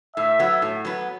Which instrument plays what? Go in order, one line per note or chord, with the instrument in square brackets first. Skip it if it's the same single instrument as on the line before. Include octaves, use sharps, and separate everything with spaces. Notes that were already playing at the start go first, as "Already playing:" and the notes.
[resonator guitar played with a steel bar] A2 [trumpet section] E5
[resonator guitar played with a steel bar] F#3 B3
A2
F#3 B3